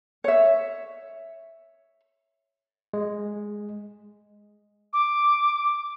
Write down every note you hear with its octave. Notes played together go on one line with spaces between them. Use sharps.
C#5 E5
G#3
D6